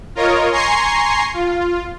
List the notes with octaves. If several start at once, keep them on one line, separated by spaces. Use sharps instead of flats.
F4 A#4 C#5 D#5
G#5 A#5 C6 C#6 C7
F4